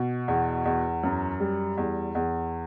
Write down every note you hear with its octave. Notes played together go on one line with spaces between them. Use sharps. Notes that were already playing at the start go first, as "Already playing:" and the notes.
Already playing: B2
E2
E2
F#2
G3
E2
E2